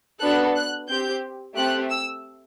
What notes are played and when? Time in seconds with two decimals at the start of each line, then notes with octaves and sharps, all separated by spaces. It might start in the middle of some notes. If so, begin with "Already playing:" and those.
0.20 B3 D4 F#4 A4 F#6
0.55 F#6
0.88 C4 G4 G6
1.56 A3 C4 G4 F#6
1.90 E6